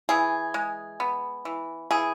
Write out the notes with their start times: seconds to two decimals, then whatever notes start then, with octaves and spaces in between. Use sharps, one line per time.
0.09 E3 G#4
0.54 G#3
1.00 B3
1.45 E3
1.91 E3 G#4